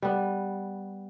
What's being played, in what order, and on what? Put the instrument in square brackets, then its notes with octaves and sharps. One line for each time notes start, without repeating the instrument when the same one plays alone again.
[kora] G3 B3